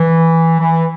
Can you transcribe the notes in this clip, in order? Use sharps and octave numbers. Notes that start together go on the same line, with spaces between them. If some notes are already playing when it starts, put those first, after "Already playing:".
Already playing: E3
E3